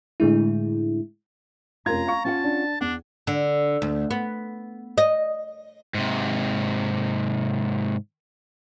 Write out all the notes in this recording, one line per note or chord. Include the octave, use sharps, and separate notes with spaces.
A2 D3 G#3 E4
F1 C#4 F4 A#4 A#5 G#6
F5 C#6
C#4 F4 F#5 A5
D4
E2 D4 F#5
D3
D2
B3
D#5
G#2 C3